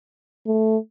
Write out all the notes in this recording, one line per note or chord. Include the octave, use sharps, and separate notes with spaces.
A3